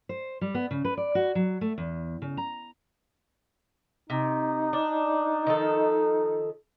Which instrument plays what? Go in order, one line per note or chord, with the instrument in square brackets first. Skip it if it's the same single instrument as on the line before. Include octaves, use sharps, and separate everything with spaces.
[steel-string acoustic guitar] C5
G3
B3
C#3
B4
D5
F#4
F#3
A3
E2
C#3
A#5
[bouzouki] C3 [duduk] D#4
[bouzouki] D4
D#3 F3 A4